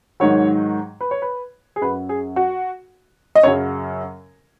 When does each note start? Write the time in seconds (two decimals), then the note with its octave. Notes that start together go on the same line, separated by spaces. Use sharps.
0.20 G#2 D#3 F#3 C#5
1.01 B4
1.11 C#5
1.22 B4
1.76 G#4
1.81 F#2 F#3 B4
2.09 G#4
2.36 F#4
3.35 D#5
3.43 F#2 C#3 F#3 C#5